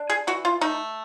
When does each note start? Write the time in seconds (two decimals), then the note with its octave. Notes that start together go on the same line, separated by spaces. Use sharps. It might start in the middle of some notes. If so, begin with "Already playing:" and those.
Already playing: D4
0.10 G#4
0.27 E3 F#4
0.45 F4
0.61 A3 D#4